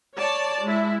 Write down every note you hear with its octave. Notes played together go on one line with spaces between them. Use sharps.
C#5 D5 A5
G#3 E4